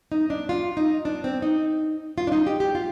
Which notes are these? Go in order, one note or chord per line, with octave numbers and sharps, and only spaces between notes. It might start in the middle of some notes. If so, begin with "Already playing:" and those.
D#4
D4
F4
D#4
D4
C4
D#4
F4
D4
D#4
G4
G4
F4